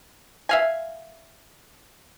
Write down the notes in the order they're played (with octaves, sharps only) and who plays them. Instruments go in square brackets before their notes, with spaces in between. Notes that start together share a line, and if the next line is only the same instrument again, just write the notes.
[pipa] E5 F5 G#5